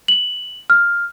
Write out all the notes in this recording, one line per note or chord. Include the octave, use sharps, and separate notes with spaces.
F#7
F6